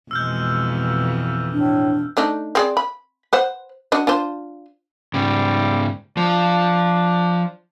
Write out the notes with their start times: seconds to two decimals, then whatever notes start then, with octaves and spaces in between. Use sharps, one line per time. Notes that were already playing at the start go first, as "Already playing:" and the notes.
0.11 F2 B2 E3 G#3 E6 F6 G6
1.53 A2 D4
2.17 A3 D4 D#4
2.55 C4 G#4 D5
2.77 B5
3.33 B4 C5 F#5
3.92 D4 F#4 D#5
4.07 D4 F4 C5
5.14 G#2 C#3 G3
6.17 F3 D4